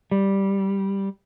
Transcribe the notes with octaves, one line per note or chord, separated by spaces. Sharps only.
G3